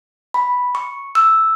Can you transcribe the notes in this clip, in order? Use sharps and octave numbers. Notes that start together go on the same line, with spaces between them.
B5
C#6
E6